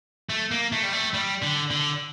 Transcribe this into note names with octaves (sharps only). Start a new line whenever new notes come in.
A3
A#3
A3
G3
A3
G3
D3
D3